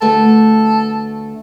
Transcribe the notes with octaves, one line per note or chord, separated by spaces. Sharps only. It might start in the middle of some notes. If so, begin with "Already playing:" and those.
D2 A3 A4 B4